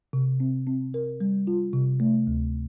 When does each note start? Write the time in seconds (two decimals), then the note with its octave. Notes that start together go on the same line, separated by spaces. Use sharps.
0.13 C3
0.40 C4
0.67 C4
0.94 A#4
1.21 G3
1.47 F4
1.73 C3
2.00 A3
2.27 D2